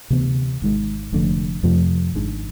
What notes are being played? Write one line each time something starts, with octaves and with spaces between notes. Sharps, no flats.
D2 C3 E3 B3
G#1 G#2 G#3
F1 F2 D3 A3
F2 C3 F3 A3
G#1 G#2 G#3 D4